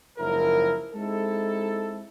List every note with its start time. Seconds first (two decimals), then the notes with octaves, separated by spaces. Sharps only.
0.18 F#1 G#2 F3 E4 A#4
0.94 G#3 C4 D#4 E4 A4